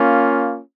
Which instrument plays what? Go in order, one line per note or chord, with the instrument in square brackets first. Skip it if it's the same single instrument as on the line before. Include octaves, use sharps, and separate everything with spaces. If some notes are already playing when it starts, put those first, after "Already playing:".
Already playing: [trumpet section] A#3 C#4 F4